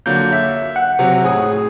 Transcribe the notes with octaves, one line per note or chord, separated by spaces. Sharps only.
D3 F#3 A#3 G6
E5
F#5
C3 F#3 C4
A2 G#4 D#6